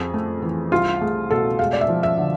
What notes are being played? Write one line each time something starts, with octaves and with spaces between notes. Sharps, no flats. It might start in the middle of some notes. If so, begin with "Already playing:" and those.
Already playing: F2 F3 G#4
A3
E3
C2 F4
A3 G#4
B2 A4
G#3 F5
D5
E5
F3
E5
D3